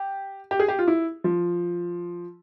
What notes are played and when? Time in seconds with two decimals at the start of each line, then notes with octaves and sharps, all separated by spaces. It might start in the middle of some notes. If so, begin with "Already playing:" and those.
Already playing: G4
0.51 G4
0.60 G#4
0.68 G4
0.79 F4
0.87 E4
1.24 F3